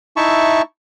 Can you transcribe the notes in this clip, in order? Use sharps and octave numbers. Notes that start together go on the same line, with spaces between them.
D#4 E4 E5 A5 C#6